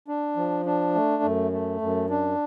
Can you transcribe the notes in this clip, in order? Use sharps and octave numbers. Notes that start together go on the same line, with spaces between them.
D4
F3
D4
A3
F#2
A3
F#2
D4